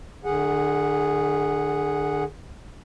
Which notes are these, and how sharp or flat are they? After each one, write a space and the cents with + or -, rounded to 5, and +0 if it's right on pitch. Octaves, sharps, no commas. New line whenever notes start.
D3 +35 G#4 -10 F#5 -5